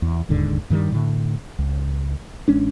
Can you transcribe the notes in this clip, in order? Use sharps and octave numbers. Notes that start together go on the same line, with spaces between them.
E2
E1 D#2 G#2 D3
G2 D#3 F#3 G3
A2 D3
C#2
A1 G#3 C#4 D4